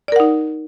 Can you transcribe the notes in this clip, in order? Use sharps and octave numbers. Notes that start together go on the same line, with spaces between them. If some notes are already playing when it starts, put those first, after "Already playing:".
D#4 A#4 D5 F#5